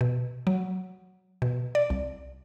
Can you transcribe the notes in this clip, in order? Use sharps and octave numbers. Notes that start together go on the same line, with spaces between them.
B2
F#3
B2
D5
C2